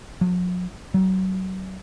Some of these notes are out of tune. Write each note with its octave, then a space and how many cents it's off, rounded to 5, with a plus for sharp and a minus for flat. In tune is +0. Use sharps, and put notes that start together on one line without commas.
F#3 -45
F#3 +25